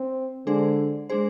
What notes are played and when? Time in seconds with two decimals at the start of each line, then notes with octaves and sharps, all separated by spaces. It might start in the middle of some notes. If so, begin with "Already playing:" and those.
Already playing: C4
0.47 D3 G#3 D4 G#4 C5
1.10 G#3 D4 G#4 C5